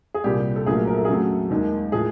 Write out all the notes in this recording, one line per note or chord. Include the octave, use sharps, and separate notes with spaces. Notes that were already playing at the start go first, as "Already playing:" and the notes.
G#4
C2 A#2 G3 G4
A4
A#1 A#2 F#3 A3 G#4
A#4
A4
G#4
F2 C#3 F#3 A3 A4
D#2 D#3 G#3
A2 F3 G#4